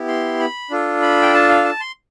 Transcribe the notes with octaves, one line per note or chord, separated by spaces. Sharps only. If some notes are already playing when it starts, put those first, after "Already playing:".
Already playing: B3 E4 G4
C6
B5
D4 F4 A4
B5
G5
A5
F5
A5
C6